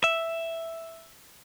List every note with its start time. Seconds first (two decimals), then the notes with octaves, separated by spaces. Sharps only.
0.04 E5